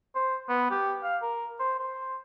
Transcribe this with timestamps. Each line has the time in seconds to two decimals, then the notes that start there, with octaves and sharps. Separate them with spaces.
0.15 C5
0.49 B3
0.71 G4
1.03 F5
1.22 A#4
1.60 C5
1.80 C5